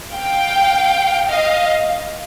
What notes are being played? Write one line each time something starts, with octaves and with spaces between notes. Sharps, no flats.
F5 G5
D#5 F5